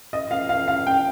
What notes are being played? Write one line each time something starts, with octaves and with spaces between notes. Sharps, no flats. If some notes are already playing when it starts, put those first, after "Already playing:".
D#5
F5
F5
F5
G5